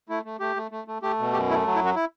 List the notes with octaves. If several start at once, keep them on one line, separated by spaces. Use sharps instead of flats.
A3 E4
A3
A3 G4
A3
A3
A3
A3 G4
B2
F#2 G4
A3 E4
F#3
E4
F#2
F#4
E4